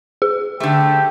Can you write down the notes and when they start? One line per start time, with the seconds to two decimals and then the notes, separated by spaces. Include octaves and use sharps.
0.22 G#4
0.60 D3 A3 G4